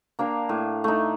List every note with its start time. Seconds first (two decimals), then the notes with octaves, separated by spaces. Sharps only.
0.19 A#3 D4 F5 G5
0.49 A2
0.84 A3 D#4